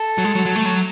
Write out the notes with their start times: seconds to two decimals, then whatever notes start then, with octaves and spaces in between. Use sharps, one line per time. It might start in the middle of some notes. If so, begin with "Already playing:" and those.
Already playing: A4
0.18 F#3
0.25 G#3
0.35 F#3
0.46 F#3
0.56 A3
0.66 F#3